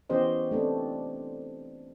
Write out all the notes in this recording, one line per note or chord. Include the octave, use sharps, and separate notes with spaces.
E3 B3 C#4 G4 C5 D#5
A3 C4 D4